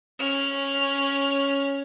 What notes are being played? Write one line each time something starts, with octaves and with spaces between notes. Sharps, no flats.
C#4 F6